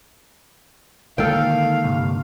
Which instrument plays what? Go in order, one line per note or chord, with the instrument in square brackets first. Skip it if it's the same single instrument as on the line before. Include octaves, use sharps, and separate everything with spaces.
[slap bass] D3 G#3 A#3 [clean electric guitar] D#3 [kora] A4 G5 [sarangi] F5
[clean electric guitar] C2 G2